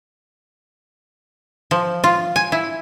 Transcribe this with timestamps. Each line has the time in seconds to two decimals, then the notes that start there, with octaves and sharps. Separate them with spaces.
1.71 F3
2.04 F4
2.36 G#5
2.52 E4